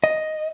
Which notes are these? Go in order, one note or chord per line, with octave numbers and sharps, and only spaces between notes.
D#5